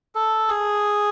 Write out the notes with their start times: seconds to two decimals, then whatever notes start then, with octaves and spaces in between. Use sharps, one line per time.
0.15 A4
0.49 G#4